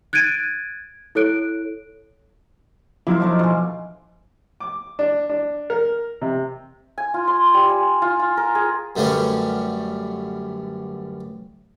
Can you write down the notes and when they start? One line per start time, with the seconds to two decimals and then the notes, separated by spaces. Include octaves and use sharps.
0.13 F#6 G#6 A6 D7 D#7
1.15 E4 A4 C#5 F#6 D7
3.07 F3 F#3 E4 F4 C6 D6
3.20 A3 D4 D#4
3.39 B2 G#4 C6
4.60 D6
4.99 D4
5.29 D4
5.70 A#4
6.22 C3
6.98 G#5
7.14 F4
7.28 C6
7.54 G3
7.69 G#5
8.02 F4
8.19 F4
8.37 A#4
8.55 G#4
8.96 F#2 D3 G3 A3 B3 C#4